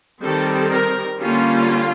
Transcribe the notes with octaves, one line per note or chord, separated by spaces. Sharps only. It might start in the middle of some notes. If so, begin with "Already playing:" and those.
D#3 G3 C4 A4
A#4
D3 G3 A#3 C#4 F4